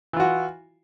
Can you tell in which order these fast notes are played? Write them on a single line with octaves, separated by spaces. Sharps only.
E3 F4 F#4